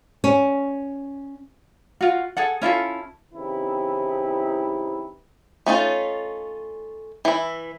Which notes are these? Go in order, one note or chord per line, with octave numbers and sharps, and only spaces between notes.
C#4
F4 F#4
G#4 A4 F#5
C#4 E4 F4 A4
C#3 E3 C4 D#4 E4 G4
A3 C#4 D#4 F4
E3 E4